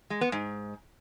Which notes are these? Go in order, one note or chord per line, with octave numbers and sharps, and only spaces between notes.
G#3
B3
G#2